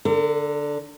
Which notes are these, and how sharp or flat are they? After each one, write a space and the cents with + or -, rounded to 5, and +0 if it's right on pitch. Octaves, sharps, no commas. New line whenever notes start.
D3 -5 A#4 -45